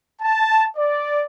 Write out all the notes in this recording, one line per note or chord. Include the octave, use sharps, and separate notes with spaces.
A5
D5